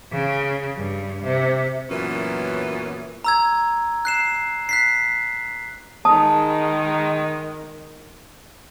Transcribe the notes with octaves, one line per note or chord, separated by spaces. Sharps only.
C#3
G2
C3
F#2 A#2 E3 F#3 B3 C#4
A#5 E6 G#6
F#6 C7 E7
F#6 B6 C7
D#3 G#3 A5 D#6